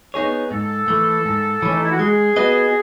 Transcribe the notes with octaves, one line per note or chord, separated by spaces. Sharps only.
B3 D#4 G#4 C#5
G#2 A4
E3 A3
G#2
E3 A3 C#4
D#4
E4
F#4
G#3 G#4
B3 F#4 B4 D#5